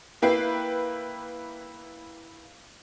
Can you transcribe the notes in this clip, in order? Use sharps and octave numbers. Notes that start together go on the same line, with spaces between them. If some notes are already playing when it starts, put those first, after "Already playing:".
A#3 E4 B4 G5 C7